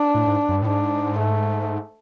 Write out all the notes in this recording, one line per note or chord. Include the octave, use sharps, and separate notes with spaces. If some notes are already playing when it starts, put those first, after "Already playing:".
Already playing: D4
A2
G#2
F#2
G2
A2
G#2 D4
A3